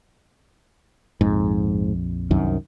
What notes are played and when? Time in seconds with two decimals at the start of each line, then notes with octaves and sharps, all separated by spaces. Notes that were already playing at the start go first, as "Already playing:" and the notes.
1.21 A#1 F2 G#2
2.31 C2 F#2 D#3